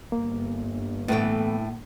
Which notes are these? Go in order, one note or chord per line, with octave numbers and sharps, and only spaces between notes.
G1 A#3
A2 E3 A3 B3 G5